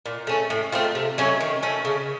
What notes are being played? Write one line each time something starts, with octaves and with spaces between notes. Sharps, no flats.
A#2
A3 C#4 A4
A2
A3 C4 F4
C3
F#3 A3 C#4
D#3
A3 C#4
C#3